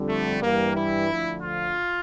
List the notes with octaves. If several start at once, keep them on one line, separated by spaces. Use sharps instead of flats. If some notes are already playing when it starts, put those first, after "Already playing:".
Already playing: F2 D3 G3
A3
G2 E3 G3 A#3
E4
D2 D3 F3
F4